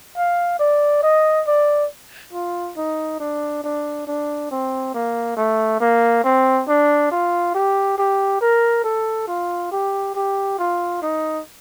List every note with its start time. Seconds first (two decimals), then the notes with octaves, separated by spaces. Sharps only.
0.17 F5
0.59 D5
1.03 D#5
1.47 D5
2.33 F4
2.77 D#4
3.20 D4
3.64 D4
4.07 D4
4.51 C4
4.94 A#3
5.37 A3
5.80 A#3
6.24 C4
6.68 D4
7.11 F4
7.55 G4
7.98 G4
8.41 A#4
8.84 A4
9.28 F4
9.72 G4
10.15 G4
10.59 F4
11.02 D#4